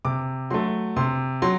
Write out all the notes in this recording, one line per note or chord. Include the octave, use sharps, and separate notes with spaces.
C3 D6
F#3 A3 C6
C3 C6
F#3 C6